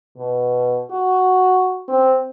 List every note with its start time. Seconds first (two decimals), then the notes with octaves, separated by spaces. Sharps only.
0.17 B2
0.91 F#4
1.89 C4